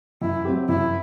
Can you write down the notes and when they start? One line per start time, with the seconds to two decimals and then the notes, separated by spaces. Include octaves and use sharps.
0.22 F#2 E4
0.45 F#3 C4 G4
0.69 F#2 E4